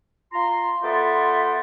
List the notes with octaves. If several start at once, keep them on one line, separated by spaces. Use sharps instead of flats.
F4 A#5 C6
B3 F4 A4 C5 D5 E5